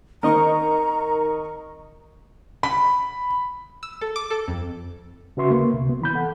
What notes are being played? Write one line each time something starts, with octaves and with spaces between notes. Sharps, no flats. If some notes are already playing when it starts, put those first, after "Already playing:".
D#3 C4 D#4 A#4 D#5 A#5 C#6
B5
E6
A4
D6
A4
F2
C#3 F#4 B4 E5 C6 C#6
A#3
C2 C3
B3
E3 B5 G6
A4 F#5